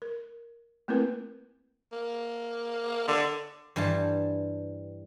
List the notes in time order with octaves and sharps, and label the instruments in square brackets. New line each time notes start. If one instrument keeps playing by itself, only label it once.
[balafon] A#4
A3 A#3 C4 E4 A#4 B4
[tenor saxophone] A#3
D3
[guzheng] G2 E3 G3 C5 A5